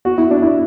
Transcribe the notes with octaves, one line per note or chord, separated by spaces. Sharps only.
F#4
E4
D4
E4